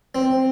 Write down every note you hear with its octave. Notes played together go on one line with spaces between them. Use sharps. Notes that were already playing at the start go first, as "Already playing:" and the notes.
C4